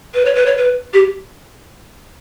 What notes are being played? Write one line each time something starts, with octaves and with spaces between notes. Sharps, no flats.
B4
C#5
B4
C#5
B4
G4